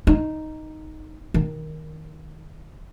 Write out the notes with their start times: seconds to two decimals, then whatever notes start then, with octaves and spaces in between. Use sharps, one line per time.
0.07 D#4
1.34 D#3